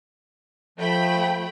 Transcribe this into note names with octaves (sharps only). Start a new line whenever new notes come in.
F3 A3 G5 B5